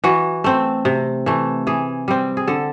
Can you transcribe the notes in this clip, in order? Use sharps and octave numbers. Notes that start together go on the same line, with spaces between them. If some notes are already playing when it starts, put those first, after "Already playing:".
E3 F#4
A3 C4
C3
E3 A3
E3 G#4
G3 C4
G#4
D3 A4